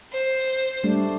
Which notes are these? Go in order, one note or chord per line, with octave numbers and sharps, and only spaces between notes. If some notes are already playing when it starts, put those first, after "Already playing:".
C5
G3 A3 D4